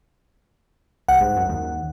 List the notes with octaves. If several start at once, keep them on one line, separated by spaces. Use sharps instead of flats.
C2 F#5
G#2
F#2
D#2